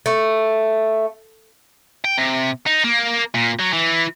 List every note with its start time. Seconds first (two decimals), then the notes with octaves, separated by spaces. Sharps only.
0.06 A3
2.05 G5
2.18 C3
2.66 D#4
2.84 A#3
3.34 A#2
3.59 F#3
3.73 E3